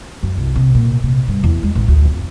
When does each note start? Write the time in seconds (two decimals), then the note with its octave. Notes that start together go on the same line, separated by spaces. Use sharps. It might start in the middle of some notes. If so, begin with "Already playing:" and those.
0.23 F#2
0.37 C2
0.55 C3
0.75 A#2
1.03 C3
1.28 G2
1.44 E2
1.63 G#3
1.75 A1
1.88 D2
2.05 F2